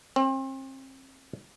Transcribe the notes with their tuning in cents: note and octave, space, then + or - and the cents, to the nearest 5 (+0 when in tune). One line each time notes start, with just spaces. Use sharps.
C4 +35